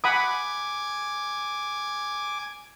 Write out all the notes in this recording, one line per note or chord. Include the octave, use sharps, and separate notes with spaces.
F#5 G#5 B5 D6 D#6